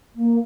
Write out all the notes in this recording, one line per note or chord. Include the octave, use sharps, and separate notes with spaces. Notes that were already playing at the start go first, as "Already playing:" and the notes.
A#3